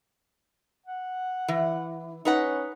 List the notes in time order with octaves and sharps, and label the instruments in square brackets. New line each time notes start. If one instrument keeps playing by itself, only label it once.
[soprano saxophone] F#5
[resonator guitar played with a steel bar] E3
[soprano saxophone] C#4 [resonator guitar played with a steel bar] D#4 B4 F#5